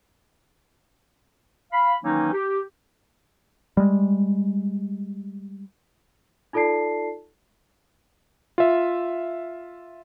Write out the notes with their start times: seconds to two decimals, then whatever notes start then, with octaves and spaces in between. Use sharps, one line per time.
1.73 F5 B5
2.04 D#3 E3 F#3 A#3 C#4 D#4
2.33 G4
3.77 G3 G#3
6.53 D#4 F4 A4 D5 A5 C7
8.58 F4 E5